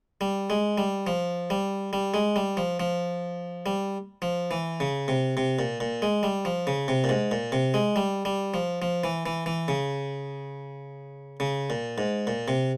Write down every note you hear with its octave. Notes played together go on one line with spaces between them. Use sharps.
G3
G#3
G3
F3
G3
G3
G#3
G3
F3
F3
G3
F3
E3
C#3
C3
C3
A#2
A#2
G#3
G3
F3
C#3
C3
A#2
G#2
A#2
C3
G#3
G3
G3
F3
F3
E3
E3
E3
C#3
C#3
A#2
G#2
A#2
C3